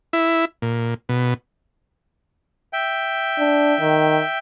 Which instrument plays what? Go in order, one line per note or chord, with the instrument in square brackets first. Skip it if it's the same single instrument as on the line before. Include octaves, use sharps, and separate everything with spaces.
[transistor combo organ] E4
A#2
B2
[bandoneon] E5 G5
[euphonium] D4
D#3